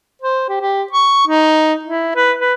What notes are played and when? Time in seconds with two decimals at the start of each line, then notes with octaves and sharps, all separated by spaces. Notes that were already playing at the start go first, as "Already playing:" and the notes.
0.22 C5
0.49 G4
0.61 G4
0.92 C#6
1.27 D#4
1.84 E4
2.16 B4
2.40 B4